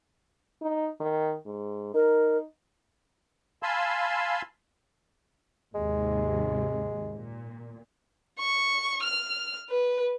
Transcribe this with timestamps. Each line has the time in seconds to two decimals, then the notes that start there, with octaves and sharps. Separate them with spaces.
0.62 D#4
1.00 D#3
1.46 G#2
1.94 D#4 A#4
3.63 F5 G#5 A5 B5 C6 E6
5.75 D#2 G#2 C3 G#3
7.14 A#2
8.39 C#6
9.03 F6
9.70 B4